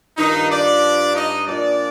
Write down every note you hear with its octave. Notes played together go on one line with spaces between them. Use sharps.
G2 D#3 F3 D#4
D4 D5
D#4 D#5
A#2 F3 D4 D5